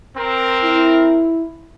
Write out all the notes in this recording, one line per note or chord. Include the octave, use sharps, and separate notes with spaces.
C4 A#4
E4